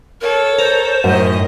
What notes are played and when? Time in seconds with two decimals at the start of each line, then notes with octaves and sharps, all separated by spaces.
0.21 A4 A#4 C#5
0.58 A#4 C5
1.04 F#2 A2 D#3 D#5